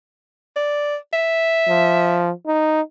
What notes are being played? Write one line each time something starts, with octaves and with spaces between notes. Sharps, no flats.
D5
E5
F3
D#4